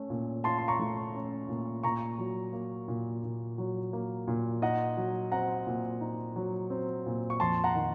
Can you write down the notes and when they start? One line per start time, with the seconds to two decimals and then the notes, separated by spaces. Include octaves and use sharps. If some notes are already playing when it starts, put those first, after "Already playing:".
Already playing: A3 C#4
0.10 A#2
0.44 F4 A5 C6
0.58 C6
0.68 A#5 C#6
0.80 A3
1.14 C#4
1.49 A#2
1.83 A#2 A#5 C#6
2.18 F#3
2.53 A#3
2.88 A#2
3.23 A#2
3.58 F#3
3.93 A#3
4.28 A#2
4.62 D#4 D#5 F#5
4.97 F#3
5.32 C4 F#5 A#5
5.67 A#2
6.01 D#4
6.36 F#3
6.70 C4
7.06 A#2
7.30 C#6
7.40 F2 A5 C6
7.64 F#5 A#5
7.75 D#3